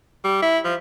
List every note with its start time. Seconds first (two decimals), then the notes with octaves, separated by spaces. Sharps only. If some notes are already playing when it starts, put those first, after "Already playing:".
0.24 G3
0.42 E4
0.65 F3